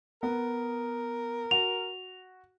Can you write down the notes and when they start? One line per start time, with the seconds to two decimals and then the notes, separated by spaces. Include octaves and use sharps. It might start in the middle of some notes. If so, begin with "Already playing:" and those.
0.23 B3 A#4
1.51 F#4 F7